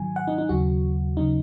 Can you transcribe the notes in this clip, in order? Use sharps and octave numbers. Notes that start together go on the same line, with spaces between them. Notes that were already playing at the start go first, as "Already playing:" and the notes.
Already playing: G#2 D#3 F#3 G#5
F#5
D#4
D#4
D#2 C#3 F#3 F#4
D#2 C#3 F#3 D#4